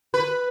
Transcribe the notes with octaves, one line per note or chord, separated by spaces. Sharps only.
B4